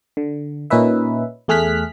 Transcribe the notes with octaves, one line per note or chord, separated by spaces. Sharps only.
D3
A#2 C#4 D#4 B4 E5
E2 A3 G#4 F6 F#6 B6